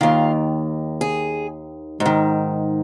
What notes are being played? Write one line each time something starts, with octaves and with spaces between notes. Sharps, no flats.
D#2 D#3 F4
G#4
G#2
D#3